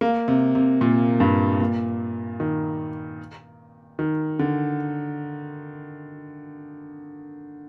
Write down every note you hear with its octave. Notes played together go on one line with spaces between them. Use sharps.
A#3
C3
C3
A#2
G2
A#2
D#3
D#3
D3